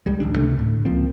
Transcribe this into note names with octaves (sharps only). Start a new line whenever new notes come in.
D2 G3 G#3
D1 A1 D4
C#2 C3 A3
D2 A2
C#2 F3 A#3 C4